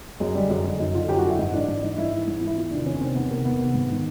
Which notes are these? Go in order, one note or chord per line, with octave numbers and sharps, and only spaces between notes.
F#2 G#3
D3 G3
F#2 G#3
D3
F#2 D#4
D3 F4
F#2 G4
F#4
D3
E4
G#2 D#4
E3 D4
G#2 D4
E3 D#4
G#2 E4
E3
G#2
E3
E4
E2 F4
C3 D#3 D4
E2 C#4
C3 D#3 C4
E2 B3
C3 D#3 A#3
E2 B3
C3 D#3
G#2
D#3